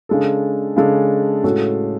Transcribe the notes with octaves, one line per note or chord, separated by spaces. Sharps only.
C#3 G#3 D4 A4
C#3 G#3 D4 A4
A2 G#3 C#4 F#4 A4